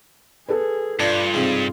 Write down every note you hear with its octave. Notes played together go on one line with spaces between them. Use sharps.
G#4 A4 B4
G2 D4 F4
G#2 C3